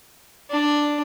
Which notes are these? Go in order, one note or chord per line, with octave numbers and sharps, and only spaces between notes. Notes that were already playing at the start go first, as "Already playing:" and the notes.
D4